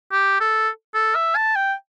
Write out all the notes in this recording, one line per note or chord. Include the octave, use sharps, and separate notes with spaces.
G4
A4
A4
E5
A5
G5